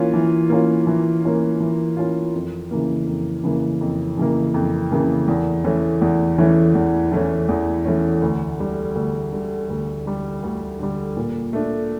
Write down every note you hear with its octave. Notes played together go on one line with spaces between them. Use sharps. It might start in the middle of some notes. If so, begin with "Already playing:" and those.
Already playing: E3 A#3 C#4 F4
E3
A#3 C#4 F4
E3
A#3 C#4 F4
E3
A#3 C#4 F4
F2
C#3 E3 A#3
F2
C#3 E3 A#3
F2
C#3 E3 A#3
F2
C#3 E3 A#3
E2
E3 A3 C#4
E2
E3 A3 C#4
E2
E3 A3 C#4
E2
E3 A3 C#4
D2
D3 G3
D2
D3 G3
D2
D3 G3
D2
D3 G3
A#2
A3 D4